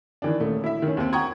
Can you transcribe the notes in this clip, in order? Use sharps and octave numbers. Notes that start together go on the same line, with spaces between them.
D#3 E3 D4
D#1 A3
E4 E5
D#3 C#4
D#2 C4
F#5 G5 A#5 C#6 D#6 G#6